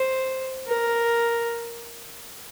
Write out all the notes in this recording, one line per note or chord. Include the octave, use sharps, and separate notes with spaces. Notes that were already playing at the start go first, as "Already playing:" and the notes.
Already playing: C5
A#4